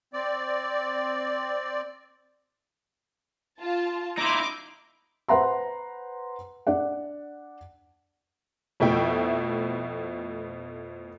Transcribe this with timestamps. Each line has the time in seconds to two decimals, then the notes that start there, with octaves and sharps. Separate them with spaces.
0.13 C4 D5
3.61 F4 A5
4.18 D#4 E4 C6 D6
5.29 B4 C5 F#5 A#5 C6
6.67 D4 D5 F#5
8.80 F2 B2 A3 E4 G5